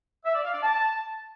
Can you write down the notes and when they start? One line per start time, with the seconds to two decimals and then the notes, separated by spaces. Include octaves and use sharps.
0.25 E5
0.34 D5
0.44 F5
0.53 D5
0.63 A5